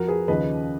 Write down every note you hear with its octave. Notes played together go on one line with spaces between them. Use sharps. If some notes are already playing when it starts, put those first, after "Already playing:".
Already playing: F2 F3 F#4 A#4
G#4 B4
D#2 C#3 F3 B4 D#5